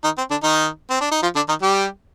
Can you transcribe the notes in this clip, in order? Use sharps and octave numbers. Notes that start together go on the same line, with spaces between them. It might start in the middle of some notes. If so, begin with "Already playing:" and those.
D#3 D#4
C4
D3 D4
D#3 D#4
C4
D4
D#4
F3 F4
D3 D4
D#3 D#4
G3 G4